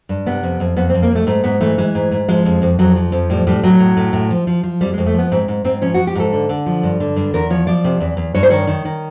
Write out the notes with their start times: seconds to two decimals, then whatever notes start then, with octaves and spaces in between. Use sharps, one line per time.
0.09 G2
0.26 C3 B3
0.43 F2
0.60 F2
0.76 F2 B3
0.90 C4
0.94 F2
1.03 A#3
1.10 F2 A3
1.27 G#2 A3
1.44 G#2 B3
1.60 E3 A3
1.78 E3 G#3
1.95 G#2
2.11 G#2
2.29 F3 G#3
2.45 F2
2.62 F2
2.79 F2 F#3
2.96 F3
3.12 F2
3.30 A2 G3
3.47 A2 G3
3.63 A2 F#3
3.79 A2
3.97 A2
4.13 A2
4.30 F3
4.47 F3
4.63 F3
4.81 F2 G3
4.93 G#3
4.98 F2
5.06 A3
5.14 F3 B3
5.32 G#2 C4
5.48 G#2
5.64 G#2 C4
5.82 F3 C#4
5.94 F#4
5.99 F3
6.07 G4
6.15 G#2 A4
6.33 D3
6.49 D3
6.66 F3
6.83 G2
7.00 D3
7.16 G2
7.34 E2 A#4
7.50 F3 C#5
7.67 F3 D5
7.84 C3
8.00 E2
8.17 E2
8.34 G2 C#5
8.43 C5
8.50 D#3 C#5
8.67 D#3
8.85 D#3